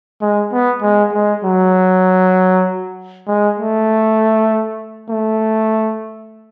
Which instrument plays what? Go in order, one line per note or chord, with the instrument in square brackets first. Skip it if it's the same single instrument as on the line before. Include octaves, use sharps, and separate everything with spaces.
[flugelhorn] G#3
B3
G#3
G#3
F#3
G#3
A3
A3